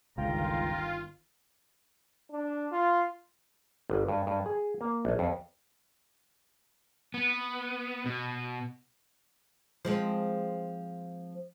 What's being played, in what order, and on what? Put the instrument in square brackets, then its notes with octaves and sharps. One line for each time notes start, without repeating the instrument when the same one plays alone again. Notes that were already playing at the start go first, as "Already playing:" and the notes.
[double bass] G1 D#3 [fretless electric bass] C#2 [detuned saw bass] F4 [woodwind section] G5 A#5
[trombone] D4
F4
[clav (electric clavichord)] G1
G2
G2
G#4
A#3
A#1
F2
[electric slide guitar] B3
B2
[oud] F3 G#3 C4